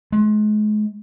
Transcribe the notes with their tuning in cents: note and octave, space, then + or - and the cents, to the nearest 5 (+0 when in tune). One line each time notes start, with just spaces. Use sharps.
G#3 +35